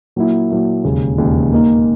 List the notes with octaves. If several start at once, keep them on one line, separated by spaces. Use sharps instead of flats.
A#2 F#3 A#3 E4
A#2 F#3 A#3 E4
E1 D#2 C#3
E1 D#2 C#3
A#2 A#3 D#4